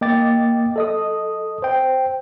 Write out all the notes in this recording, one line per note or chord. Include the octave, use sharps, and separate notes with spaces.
A#3 D#5 G5 D6 A6
A4 D#5 D#6
C5 G5